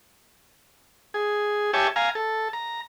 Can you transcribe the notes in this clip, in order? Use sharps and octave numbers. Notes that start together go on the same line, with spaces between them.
G#4
G4 C#5 E5 G#5 A5
F5 G#5 A#5
A4
A#5